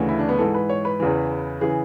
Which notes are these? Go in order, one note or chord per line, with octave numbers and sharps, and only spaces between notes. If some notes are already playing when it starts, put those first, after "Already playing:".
Already playing: D2 C#3 E3
E4
D4
B3
G#2 E3 A4
B4
C#5
B4
E2 C#3 E3
C#3 E3 G#4